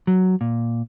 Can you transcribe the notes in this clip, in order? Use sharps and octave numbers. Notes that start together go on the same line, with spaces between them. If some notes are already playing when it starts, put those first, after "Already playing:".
F#3
A#2